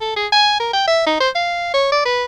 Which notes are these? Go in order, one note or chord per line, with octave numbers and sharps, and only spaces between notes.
A4
G#4
G#5
A#4
G5
E5
D#4
C5
F5
C#5
D5
B4